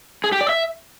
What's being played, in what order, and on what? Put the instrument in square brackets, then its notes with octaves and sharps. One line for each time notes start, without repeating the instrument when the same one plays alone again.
[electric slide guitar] G#4
G4
D5
E5